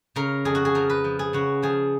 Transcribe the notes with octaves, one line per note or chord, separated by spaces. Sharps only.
C#3 A#4
F2 G#4
F#4
G#4
F3 A#4
B4
F3
G#4
C#3 F#4
F3 G#4